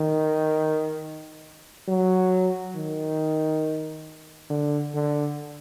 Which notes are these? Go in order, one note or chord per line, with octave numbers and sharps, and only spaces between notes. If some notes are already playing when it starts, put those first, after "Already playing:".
Already playing: D#3
F#3
D#3
D3
D3